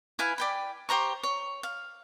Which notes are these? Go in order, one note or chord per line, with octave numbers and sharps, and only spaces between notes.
E4 B4 F5 G#5
D5 G5 B5
G4 C5 A#5 C#6
C#5
F5